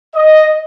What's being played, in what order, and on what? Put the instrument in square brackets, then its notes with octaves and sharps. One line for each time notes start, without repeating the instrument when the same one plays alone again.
[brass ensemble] D#5